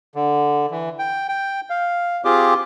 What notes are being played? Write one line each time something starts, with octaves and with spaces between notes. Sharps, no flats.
D3
E3
G5
G5
F5
C4 F4 G4 G#4 D6